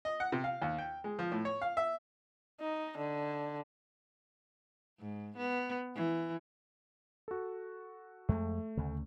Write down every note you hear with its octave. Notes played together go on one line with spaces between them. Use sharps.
D#5
F#5
C3
F5
D#2
G5
G#3
F3
A2
C#5
F5
E5
D#4
D3
G#2
B3
E3
F#4 A4
F2 G#3 A3
D2 C#3